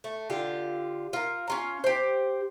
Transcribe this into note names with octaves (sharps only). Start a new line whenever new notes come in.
A3
D3 F4 G4
F4 A#4
C#4 F4 A#5
G4 C5